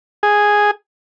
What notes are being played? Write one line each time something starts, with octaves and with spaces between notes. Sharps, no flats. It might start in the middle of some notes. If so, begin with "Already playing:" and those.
G#4